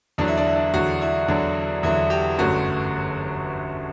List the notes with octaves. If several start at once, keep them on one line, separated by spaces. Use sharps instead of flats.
E2 D3 F#3 D4
E4
D4
E4
D4
E2 D3 F#3 F#4
E4
E2 D3 F#3 D4
E2 D3 F#3 E4
G4
G1 F#2 D3 F#3 A3 F#4